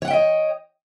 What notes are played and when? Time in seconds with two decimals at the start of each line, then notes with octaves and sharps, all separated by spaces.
0.02 C#5
0.05 F#5
0.08 G5
0.10 E5
0.13 D#5